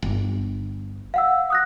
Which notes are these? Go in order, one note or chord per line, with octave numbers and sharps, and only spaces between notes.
G1
F5 F#5 E6
D#6 F#6 A#6